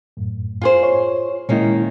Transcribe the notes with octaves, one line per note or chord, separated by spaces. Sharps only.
F#2 A2
F4 G#4 C5
C#5
A#2 D#3 G#3 A#3 C#4 E4